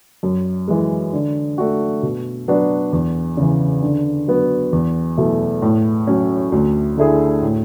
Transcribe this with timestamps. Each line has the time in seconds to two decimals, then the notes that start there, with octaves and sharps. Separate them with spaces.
0.23 F#2
0.68 E3 G#3
1.13 D3
1.58 A3 D4 F#4
2.03 B2
2.48 F#3 B3 D4 F#4
2.93 E2
3.37 C#3 E3
3.82 D3
4.27 F#3 B3 F#4
4.73 E2
5.17 B2 F#3 A3 E4
5.62 A2
6.07 F#3 C#4
6.52 D2
6.97 D3 A3 E4 G#4
7.42 A2